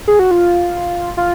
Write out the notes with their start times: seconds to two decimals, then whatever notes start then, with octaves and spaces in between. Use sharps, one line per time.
0.07 G#4
0.19 F#4
0.31 F4
1.17 F4